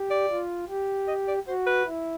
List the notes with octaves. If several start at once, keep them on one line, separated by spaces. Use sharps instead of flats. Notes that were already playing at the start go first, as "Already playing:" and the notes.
Already playing: G4
D5
F4
G4
D#5
D5
F#4 C5
B4
E4